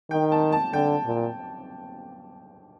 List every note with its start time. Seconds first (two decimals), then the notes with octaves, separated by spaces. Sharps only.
0.11 D#3 G5
0.32 A5
0.52 A5
0.73 D3 G5
1.05 A#2